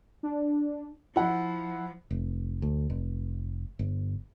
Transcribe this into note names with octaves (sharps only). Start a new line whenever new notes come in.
D4
F3 E4 F#5
F1
D2
F1
G1